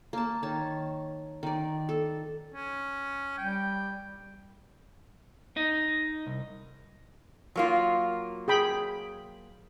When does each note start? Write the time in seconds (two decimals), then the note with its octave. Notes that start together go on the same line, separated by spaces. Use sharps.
0.13 A#3 A5
0.43 D#3 C#5 A5
1.43 D#3 D5
1.89 A4
2.54 C#4
3.38 G3 G5
5.57 D#4
6.27 C2
7.56 F#3 A#3 F4
8.48 G#4 G5 B5